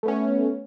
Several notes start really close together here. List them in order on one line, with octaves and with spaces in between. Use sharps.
A3 B3 C#4